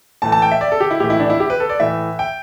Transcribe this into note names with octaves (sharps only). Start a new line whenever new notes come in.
A2 E3 A3 A5
A5
G5
E5
D5
A4
G4
E4
A2 E3 A3 G4
E4
D4
E4
G4
B4
A4
D5
A2 E3 A3 E5
G5